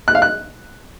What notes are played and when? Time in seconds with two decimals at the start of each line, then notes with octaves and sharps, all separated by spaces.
0.08 F#6
0.15 F5
0.22 F#6